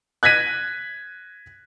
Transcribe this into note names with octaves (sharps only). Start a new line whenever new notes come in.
F#6 G#6 A#6 B6 D#7